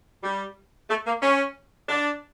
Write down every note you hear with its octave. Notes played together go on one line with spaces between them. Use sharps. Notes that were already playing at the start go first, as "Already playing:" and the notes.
G3
A3
A#3
C#4
D4